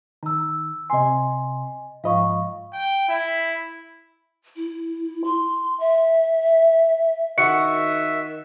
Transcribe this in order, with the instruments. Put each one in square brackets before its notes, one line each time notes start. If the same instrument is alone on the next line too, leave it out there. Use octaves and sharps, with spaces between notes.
[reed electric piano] D#3 [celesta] A#5 E6
[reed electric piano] C3 C6 [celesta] D#5 G#5
[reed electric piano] G#2 F3 D#5 [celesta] F5 B5 C#6
[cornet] G5
E4
[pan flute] E4
C6
E5
[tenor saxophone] D#3 [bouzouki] F#4 [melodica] E5 [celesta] C#7